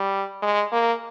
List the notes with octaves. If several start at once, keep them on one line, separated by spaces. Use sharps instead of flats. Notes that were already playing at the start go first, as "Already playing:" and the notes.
Already playing: G3
G#3
A#3